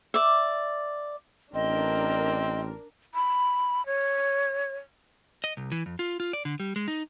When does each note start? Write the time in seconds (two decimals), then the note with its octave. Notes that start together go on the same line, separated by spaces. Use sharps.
0.14 D5 E5
1.54 A1 C4 D4 A#4 D#5
3.15 B5
3.86 C#5
5.44 D#5
5.57 C2
5.72 E3
5.86 F2
5.99 F4
6.20 F4
6.33 D5
6.45 D3
6.60 G3
6.76 G#3
6.88 D#4